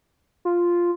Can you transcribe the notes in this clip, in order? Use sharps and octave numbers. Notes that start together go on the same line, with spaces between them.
F4